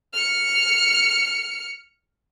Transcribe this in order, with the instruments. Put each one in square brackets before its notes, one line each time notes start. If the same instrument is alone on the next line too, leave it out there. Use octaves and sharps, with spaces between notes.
[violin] F6 C#7